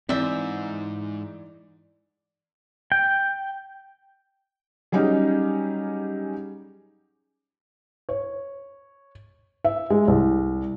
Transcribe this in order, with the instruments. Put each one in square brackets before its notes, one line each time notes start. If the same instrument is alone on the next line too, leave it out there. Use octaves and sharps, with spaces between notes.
[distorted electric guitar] G#2 [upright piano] E3 D5 [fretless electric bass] C4 [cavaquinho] C5 E5
[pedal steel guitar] G5
[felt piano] F#3 G3 C#4 D#4 G4 G#4
C#5
E5
G#3
C2